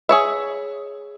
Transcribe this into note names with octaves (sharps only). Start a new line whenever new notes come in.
G#4 C#5 E5